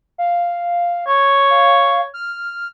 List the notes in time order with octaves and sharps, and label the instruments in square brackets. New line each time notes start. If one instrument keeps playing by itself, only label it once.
[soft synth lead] F5
[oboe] C#5
[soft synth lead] F5
F6